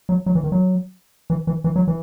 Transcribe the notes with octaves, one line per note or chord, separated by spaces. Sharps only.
F#3
F#3
E3
D#3
F#3
E3
E3
E3
F#3
E3